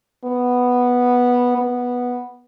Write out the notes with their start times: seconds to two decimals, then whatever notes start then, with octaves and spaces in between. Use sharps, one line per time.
0.25 B3
1.58 B3